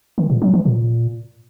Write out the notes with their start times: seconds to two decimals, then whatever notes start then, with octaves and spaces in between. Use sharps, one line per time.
0.18 D#3
0.30 A#2
0.42 F#3
0.54 E3
0.66 A#2